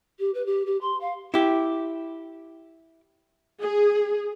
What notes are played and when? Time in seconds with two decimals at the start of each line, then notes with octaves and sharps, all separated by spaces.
0.19 G4
0.34 B4
0.46 G4
0.66 G4
0.81 C6
1.01 F5
1.34 E4 G4
3.60 G#4